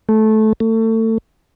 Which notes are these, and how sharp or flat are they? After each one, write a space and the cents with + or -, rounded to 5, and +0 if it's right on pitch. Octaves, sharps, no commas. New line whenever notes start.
A3 -15
A3 +30